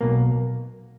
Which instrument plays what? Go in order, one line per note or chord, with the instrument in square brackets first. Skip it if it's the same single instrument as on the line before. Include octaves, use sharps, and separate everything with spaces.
[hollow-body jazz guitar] B1 B2 A#3